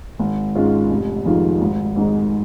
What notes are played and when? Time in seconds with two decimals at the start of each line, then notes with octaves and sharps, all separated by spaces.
0.19 G#1
0.55 G#2 G#3 C#4 F4
0.90 F1
1.26 F2 D#3 G#3 F4
1.61 G#1
1.96 G#2 D#3 G#3 D#4